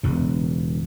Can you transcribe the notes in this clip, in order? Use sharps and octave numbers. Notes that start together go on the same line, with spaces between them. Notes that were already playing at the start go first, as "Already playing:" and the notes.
E1 E2 C#3